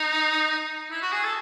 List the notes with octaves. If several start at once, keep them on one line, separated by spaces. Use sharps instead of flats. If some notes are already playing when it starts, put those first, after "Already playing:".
Already playing: D#4
E4
F#4
G#4
A4